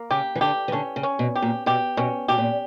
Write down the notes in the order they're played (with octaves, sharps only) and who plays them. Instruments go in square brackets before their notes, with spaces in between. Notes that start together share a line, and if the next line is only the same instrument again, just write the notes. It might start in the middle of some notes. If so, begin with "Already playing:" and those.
Already playing: [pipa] A#3
[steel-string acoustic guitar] C#3 [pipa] G4
[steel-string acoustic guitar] E3
[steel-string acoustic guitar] D3 [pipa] G4
[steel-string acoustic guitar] E3
[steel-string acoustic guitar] D3 [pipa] C#4
[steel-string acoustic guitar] C#3
[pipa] C#4
[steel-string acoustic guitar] B2
[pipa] G4
[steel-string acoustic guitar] A#2
[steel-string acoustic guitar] B2 [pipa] G4
[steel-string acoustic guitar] B2 [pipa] C#4
[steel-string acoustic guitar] B2 [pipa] G4
[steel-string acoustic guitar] A#2